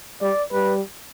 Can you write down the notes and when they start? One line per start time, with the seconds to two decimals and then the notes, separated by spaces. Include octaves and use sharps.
0.22 G3 D5
0.52 G3 B4